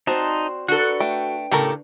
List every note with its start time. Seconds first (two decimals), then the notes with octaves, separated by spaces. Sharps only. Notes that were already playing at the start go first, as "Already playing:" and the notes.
0.07 C4 D#4 F#4 C5 D5 A5
0.68 D4 F#4 A4 B4 A#5 F#6
1.00 A3 G5
1.51 A2 C#3 G4 A4 A#4